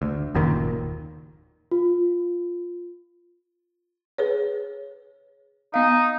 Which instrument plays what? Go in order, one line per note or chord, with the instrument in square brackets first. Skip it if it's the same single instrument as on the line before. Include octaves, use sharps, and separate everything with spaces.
[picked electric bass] D2
F#1 D#2 A#2 D#3
[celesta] F4
[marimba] G#4 B4 C#5
[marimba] B3 F5 [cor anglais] D#4